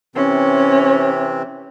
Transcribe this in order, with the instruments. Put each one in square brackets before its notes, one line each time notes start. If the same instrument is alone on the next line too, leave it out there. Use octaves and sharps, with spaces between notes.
[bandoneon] C3 E3 C4 [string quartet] C#4